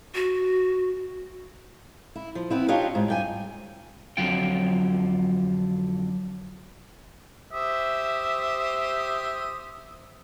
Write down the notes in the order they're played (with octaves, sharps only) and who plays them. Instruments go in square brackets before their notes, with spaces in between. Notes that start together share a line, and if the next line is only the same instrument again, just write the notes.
[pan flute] F#4
[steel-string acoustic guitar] E4
F3
B3 C4 E4
D4 D#4 F4 G4 C#5 F5
G#2
G2 G5 G#5
[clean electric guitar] F2 G#2 D3 F#3 F4 G5
[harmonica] G4 C5 D#6 [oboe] E5